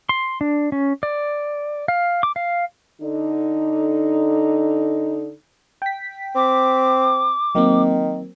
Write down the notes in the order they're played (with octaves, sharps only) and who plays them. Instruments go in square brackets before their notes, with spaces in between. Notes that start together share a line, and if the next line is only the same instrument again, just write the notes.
[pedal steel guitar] C6
D4
C#4
D5
F5
D6
F5
[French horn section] D3 D#4
[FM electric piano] G5 B6
[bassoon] C4 [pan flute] D6
[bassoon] D#3 [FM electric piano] F#3 A#3 C4